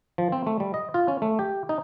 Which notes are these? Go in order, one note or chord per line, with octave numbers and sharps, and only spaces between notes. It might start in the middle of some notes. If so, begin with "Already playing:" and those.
F3
C4
A3
G3
D#5
F4
C#4
A3
G4
D#4